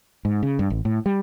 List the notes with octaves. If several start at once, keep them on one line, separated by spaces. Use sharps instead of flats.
G#2
C#3
G2
A1
A2
G3